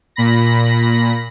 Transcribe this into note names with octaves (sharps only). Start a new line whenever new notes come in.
A#2 B5 A#6